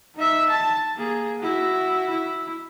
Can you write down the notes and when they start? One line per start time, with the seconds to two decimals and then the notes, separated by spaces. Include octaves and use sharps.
0.15 D#4 E5
0.50 A5
0.96 A#3 G#4
1.40 E4 F#4
2.10 E4